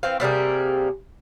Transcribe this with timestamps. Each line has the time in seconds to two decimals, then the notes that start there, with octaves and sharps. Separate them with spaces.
0.03 E3 C4 F5
0.20 C3 G3 A#3 G#4